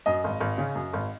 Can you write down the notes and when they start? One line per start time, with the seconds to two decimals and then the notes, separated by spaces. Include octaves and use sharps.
0.06 F#2 D#5
0.24 G#1
0.41 G#1
0.58 C#3
0.75 F#2
0.93 G#1